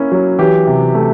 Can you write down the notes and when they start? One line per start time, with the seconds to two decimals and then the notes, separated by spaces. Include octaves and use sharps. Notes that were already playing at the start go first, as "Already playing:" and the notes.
Already playing: A#3 C#4 E4
0.12 F#3
0.39 E3 G4
0.67 C3
0.94 A3